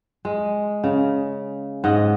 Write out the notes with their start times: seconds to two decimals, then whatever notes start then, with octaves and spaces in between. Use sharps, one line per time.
0.25 G#3
0.84 C#3
1.84 G#2 D#5 F#5